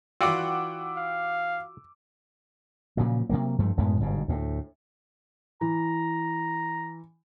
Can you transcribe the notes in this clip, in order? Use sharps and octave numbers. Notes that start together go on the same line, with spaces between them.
E3 F4 F#4 D5 F#5 G5 D6 E6
F5
A#2 C#3 F3 F#3
C3 F#3 A#3
G2 F3 A3
F#2 A2 G#3 B3
G1 G#2 B2
D2 A2
E3 A#5